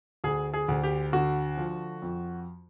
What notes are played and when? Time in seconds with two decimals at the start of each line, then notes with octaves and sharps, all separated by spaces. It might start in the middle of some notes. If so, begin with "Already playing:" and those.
0.24 D2 G#4
0.53 G#4
0.68 D2
0.83 G4
1.13 D3 F#4
1.57 F3
2.02 F2